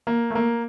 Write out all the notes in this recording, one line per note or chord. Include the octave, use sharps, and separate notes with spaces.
A#3
A3
A#3